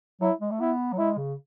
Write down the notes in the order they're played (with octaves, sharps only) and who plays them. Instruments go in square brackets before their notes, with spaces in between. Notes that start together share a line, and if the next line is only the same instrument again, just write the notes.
[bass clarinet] F#3 [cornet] E4
[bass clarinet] G#3
A3
[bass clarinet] B3 [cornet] E4
[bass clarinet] F#3
[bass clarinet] G#3 [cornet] E4
[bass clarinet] C#3